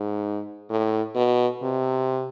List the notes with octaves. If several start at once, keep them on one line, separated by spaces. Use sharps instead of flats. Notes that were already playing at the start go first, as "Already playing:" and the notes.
Already playing: G#2
A2
B2
C3